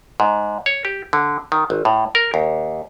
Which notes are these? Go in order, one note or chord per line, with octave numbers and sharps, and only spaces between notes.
G#2
C#5
G4
D3
D#3
G#1
A2
A#4
D#2